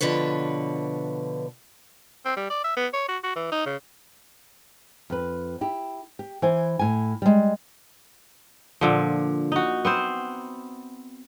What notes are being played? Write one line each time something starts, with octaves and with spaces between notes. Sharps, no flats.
B2 D3 F3 B4 C#5
C4
G3
D5
E5
B3
C#5
F#4
F#4
E3
D#4
C#3
F2 B4
E4 G4
G4
E3 C5 G#5
A2 G#5
G3 G#3
A#2 D3 F3
D#4 F#4
B3 C4 C5